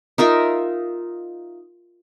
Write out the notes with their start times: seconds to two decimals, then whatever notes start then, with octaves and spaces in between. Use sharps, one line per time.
0.18 D#4 F4 A#4 E5